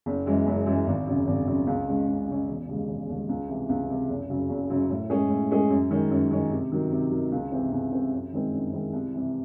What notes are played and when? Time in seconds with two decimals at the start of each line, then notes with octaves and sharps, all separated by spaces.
0.06 F#1
0.26 F#2 E3 G#3
0.46 F#1
0.66 F#2 E3 G#3
0.87 G#1
1.07 F#2 C#3
1.27 G#1
1.47 F#2 C#3
1.67 C#2
1.88 C#3 G#3 C#4
2.08 C#2
2.28 C#3 G#3 C#4
2.48 E1
2.68 D#2 C#3 G#3
2.88 E1
3.09 D#2 C#3 G#3
3.29 C#2
3.48 C3 E3
3.69 C#2
3.89 C3 E3
4.09 F#1
4.30 F#2 C#3 F#3
4.50 F#1
4.70 F#2 C#3 F#3
4.90 A2
5.10 G#3 C#4 G#4
5.30 A2
5.51 G#3 C#4 G#4
5.70 F#2
5.91 D#3 G#3 C#4
6.11 F#2
6.31 D#3 G#3 C#4
6.51 C3
6.72 D#3 F#3
6.92 C3
7.12 D#3 F#3
7.32 C#2
7.52 C3 E3 C4
7.72 C#2
7.92 C3 E3 C4
8.12 F#2
8.33 D#3 G#3 C4 E4
8.53 F#2
8.73 D#3 G#3 C4 E4
8.93 C2
9.14 C3 E3